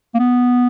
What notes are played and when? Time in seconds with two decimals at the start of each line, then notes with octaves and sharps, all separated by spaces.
0.14 A#3
0.19 B3